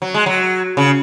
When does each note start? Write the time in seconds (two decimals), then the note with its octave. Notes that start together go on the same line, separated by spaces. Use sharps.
0.02 F#3
0.14 G#3
0.26 F#3
0.77 C#3